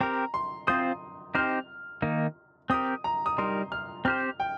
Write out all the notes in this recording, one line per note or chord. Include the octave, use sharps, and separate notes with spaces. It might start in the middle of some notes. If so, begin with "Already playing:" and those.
C4 G4 A#4 A#5
C6
C4 F4 C5 D#6
C4 D#4 G4 C5 F6
D#3 A#3 D#4
C4 G4 A#4 D#6
A#5
D#6
G3 D#4 A#4 C6
F6
C4 G4 C5 F6
G5